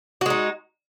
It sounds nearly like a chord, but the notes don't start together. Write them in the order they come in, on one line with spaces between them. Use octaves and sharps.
F#4 G#3 D#4